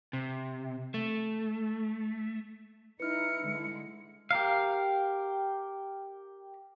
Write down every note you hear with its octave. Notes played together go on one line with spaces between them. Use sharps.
C3
A3
D#4 E4 B4 F6 C#7
D3 G#3
G4 A#4 F5